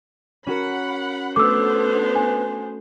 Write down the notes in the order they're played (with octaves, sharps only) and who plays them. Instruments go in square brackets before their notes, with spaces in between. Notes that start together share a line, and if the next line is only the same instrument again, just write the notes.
[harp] C#4 F#4 A#4 [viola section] F#5 B5
[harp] A3 [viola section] B3 D4 C5 [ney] B4 [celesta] D6 E6
[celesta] G#5